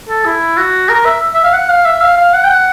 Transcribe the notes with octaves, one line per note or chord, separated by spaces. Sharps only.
A4
E4
F#4
A#4
E5
E5
F5
F#5
F5
E5
F5
F5
F#5
G5
F#5